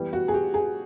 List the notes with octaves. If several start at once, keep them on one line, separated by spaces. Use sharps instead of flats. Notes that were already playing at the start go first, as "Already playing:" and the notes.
Already playing: E3 G3 B3
F#4
G#4
G4
G#4